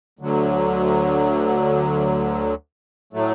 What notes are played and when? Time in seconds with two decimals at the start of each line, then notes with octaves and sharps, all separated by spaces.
0.19 D2 D3 F#3
3.13 A2 F#3 A3